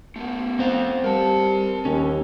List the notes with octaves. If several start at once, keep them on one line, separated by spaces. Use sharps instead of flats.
A3 B3
C4 C5 F5
G3 A#4 A5
D#2 C#4